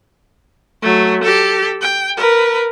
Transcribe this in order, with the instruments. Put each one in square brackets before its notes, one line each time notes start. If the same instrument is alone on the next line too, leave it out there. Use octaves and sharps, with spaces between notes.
[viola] F#3 A3
G4 A4
G5
A#4 B4